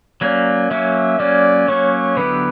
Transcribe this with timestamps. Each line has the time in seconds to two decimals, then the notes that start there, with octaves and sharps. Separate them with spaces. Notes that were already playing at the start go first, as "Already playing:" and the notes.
0.21 F#3 A#3 C#4 D5
0.71 F#3 A#3 C#4 E5
1.20 F#3 A#3 C#4 D5
1.68 F#3 A#3 C#4 C#5
2.17 D3 F#3 B3 E4 G4 B4